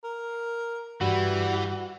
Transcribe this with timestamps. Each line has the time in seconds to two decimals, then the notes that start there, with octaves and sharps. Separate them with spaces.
0.04 A#4
1.01 G2 E3 G3 F#4